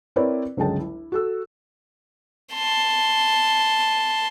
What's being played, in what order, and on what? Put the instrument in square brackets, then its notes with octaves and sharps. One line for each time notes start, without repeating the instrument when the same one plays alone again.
[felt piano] C4 E4 A#4 B4 C#5 D5
G1 C#2 F#3 G#3 G5 A5
E4
F#4 A4 E6
[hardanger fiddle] A5 C6